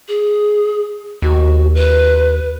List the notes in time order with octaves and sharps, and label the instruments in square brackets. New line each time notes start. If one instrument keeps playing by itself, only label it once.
[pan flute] G#4
[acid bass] D#2 [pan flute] F#4
[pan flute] B4